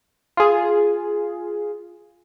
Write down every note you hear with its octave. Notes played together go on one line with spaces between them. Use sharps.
F4 G#4